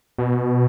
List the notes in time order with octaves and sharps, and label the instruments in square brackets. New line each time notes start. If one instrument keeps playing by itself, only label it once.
[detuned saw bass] B2